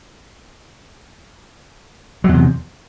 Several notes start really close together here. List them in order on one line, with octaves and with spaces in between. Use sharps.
F#3 E2 C3